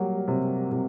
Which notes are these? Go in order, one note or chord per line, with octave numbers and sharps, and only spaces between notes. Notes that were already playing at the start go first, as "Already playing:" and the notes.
Already playing: F#3 G3 A#3
C3
C3